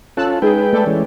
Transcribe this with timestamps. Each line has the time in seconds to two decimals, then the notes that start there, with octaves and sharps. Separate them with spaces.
0.17 C#4 F4 A4 A5 E6 F#6
0.42 G#3 D#4 G#4 B4 G5
0.73 A3 A4 D5
0.86 E3 G#3 C#4